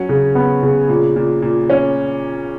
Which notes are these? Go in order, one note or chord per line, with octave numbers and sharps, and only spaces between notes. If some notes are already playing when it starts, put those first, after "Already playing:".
Already playing: F#3 C#4
C#3
B3
C#3
A#2
A#2
A#2
C#4